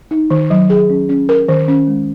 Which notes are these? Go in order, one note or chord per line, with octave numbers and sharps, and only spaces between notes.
D#4
D#3
F#3
G#4
C#4
C#4
A#4
D#3
C#4
G#3